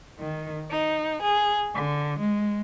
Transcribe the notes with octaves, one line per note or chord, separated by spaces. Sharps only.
D#3
D#4
G#4
D3
G#3